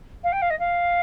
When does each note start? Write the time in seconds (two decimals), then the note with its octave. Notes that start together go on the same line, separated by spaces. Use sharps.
0.24 F5
0.32 G5
0.42 F5
0.50 D#5
0.59 F5